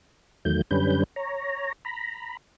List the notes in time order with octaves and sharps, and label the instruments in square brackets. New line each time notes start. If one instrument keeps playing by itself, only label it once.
[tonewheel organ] E2 D#3 F#3 A3 G6
F#2 D3 G3 C#4 B4 G6
C#5 A#5
A#5 B5